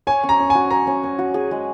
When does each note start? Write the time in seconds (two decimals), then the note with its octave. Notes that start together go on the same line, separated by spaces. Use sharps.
0.07 C#5 G#5
0.23 C#4
0.29 A#5
0.39 C#4
0.50 F#4 G#5
0.70 C#5 A#5
0.87 C#4
1.03 C#4
1.19 F#4
1.34 G#4
1.51 G#3